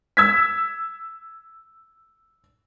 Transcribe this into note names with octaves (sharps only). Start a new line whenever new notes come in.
E6 G#6 B6